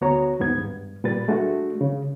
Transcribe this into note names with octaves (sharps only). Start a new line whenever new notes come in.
D2 B3 F#4 C#5 A#5
D#2 G#2 B3 G#6
G2
A#2 G3 B4 A6
G#3 A3 D4 F#4
C#3